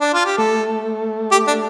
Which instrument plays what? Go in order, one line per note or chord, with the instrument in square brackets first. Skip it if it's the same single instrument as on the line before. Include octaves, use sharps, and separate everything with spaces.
[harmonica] D4
F4
G4
[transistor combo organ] A3 [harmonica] A4
[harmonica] G4
D4